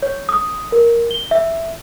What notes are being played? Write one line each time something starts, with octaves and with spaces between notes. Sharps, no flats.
C#5
D#6
A#4
G7
E5